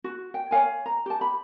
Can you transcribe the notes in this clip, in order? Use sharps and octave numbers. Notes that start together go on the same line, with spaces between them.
F#4
G5
C#5 F5 G#5
A#5
G4 A5
B5